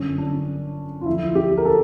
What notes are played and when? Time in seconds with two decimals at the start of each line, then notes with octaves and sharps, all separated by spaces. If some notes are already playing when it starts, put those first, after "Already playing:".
Already playing: G1 F#2 D3 C#4
0.18 D4
1.01 F4
1.06 D2 D3 F3 E4
1.35 G4
1.57 A#4
1.65 A4